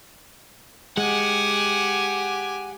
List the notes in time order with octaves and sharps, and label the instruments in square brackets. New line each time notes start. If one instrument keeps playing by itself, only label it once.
[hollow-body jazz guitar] G#3 [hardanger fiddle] G4 G#5 [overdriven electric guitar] F#5